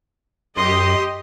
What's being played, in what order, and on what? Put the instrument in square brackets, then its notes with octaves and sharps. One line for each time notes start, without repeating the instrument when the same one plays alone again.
[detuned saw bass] F#2 [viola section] G4 D#5 [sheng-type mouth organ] C6